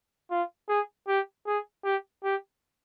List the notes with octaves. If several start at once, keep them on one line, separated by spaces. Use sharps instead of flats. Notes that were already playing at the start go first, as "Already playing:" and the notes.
F4
G#4
G4
G#4
G4
G4